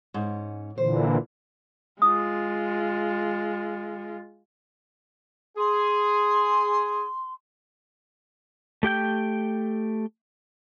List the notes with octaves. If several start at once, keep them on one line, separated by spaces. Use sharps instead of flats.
G#2 C#4
A#2 D3 E3 C5
G#3 F4 D#6
G#4 C6
A3 G4 G5 G6